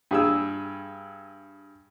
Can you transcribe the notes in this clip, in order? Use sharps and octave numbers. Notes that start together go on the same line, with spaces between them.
G2 G#4 E6